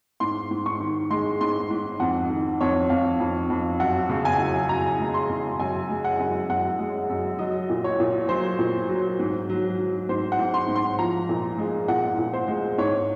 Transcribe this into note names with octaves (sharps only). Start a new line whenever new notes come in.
G#2 C6
G#2
C#6
D#3
G#3 C6
G#2 C6
G#2
F2 F#5
D#3
F2 C#5
F2 F5
F2
F2
F#2 F#5
C#3
G#5
F#2
F#2 A#5
G#3
C6
C#3
F#2 G#5
G#3
F#5
F#2
F#2 F#5
G#3
F#2
F#3 D#5
A#2
C#5
A#2
F#3 C5
A#2
F#3
G#2
F#3
F#3
G#2 C5
F#5
G#2
C6
G#2
C6
F3 A#5
A#2
G#3
A#2 F#5
A#2
C5
G#3
G#2 C#5